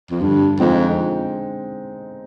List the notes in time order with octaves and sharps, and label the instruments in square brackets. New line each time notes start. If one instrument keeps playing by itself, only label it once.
[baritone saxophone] F2
[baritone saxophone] G2 [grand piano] D3
[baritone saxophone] F2 [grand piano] G#3 C4 D#4